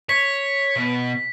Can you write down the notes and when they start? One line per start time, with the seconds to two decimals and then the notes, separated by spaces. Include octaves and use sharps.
0.09 C#5 B6
0.76 B2